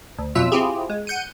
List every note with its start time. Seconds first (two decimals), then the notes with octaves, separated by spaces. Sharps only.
0.19 D2
0.35 F2 B2 F#3 F4 E5 E6
0.52 C4 E4 F4 G4 G#4
0.90 G#3
1.07 F#5 G6 C#7 D#7